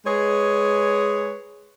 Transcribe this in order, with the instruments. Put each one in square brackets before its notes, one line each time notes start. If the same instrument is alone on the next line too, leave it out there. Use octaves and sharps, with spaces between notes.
[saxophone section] G#3 G#4 B4 C#5